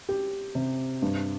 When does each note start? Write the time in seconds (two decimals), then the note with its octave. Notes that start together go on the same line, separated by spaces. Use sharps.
0.09 G4
0.55 C3
1.02 G2